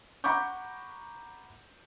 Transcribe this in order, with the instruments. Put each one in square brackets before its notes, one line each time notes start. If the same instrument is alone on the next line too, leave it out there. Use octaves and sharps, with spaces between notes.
[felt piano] F#5 A#5 B5 C#6 D6 G6